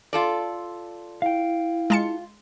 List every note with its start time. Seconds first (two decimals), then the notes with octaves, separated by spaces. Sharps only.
0.13 F4 A4 D5
1.22 E4 F5 G5
1.90 G#3 F4 A5 C#7